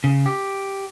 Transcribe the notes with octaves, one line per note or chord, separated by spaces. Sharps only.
C#3
G4